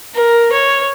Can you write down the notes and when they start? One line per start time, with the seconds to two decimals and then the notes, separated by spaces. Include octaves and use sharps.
0.14 A#4
0.52 C#5